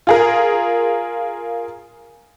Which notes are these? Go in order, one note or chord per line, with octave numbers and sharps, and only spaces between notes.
F4 G#4 A#4